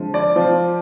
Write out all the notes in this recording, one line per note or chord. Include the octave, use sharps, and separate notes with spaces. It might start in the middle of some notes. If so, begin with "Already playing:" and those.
Already playing: D3 F3 G#3 C4
D5
F3 C4 F4